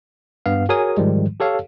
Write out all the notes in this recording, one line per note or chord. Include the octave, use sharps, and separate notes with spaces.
G2 B3 F5
F#4 G#4 A#4 C#5 G#5 D#6
G#2 D#3 F3 G3 G#3
G4 A4 C#5 F5